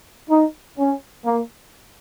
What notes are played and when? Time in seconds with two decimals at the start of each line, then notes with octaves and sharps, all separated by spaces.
0.30 D#4
0.78 C#4
1.26 A#3